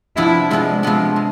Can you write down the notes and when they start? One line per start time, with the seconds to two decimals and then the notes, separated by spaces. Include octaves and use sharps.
0.16 C3 F3 B3 D4 E4
0.51 C3 F3 G#3 B3 D4
0.83 C3 F3 G#3 B3 D4
1.16 C3